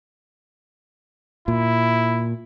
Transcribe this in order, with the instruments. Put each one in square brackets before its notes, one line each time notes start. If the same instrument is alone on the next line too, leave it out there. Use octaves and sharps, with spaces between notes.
[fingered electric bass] A#2 [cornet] E4